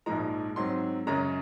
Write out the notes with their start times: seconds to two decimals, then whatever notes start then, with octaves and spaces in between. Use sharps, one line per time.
0.06 A#1 G#2 F3 G#3 A#5
0.56 G#2 F#3 C4 C6
1.07 F#2 C#3 G#3 C#4 A#5